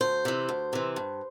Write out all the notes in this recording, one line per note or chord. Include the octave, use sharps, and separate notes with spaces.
D2 C5
C3 E3
D2
C3 E3
G2